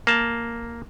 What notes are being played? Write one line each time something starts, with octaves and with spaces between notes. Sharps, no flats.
A#3 A5